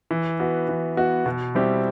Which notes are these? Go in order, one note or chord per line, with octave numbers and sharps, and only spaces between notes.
E3
B3 F#4
E3
B3 F#4
B2
G3 C4 E4 G4